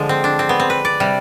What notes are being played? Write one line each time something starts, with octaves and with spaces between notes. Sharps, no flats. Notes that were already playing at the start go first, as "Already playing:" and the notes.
Already playing: D3 F3 G#3
C4
D4
C4
B3
C4
B4
D5
C3 G3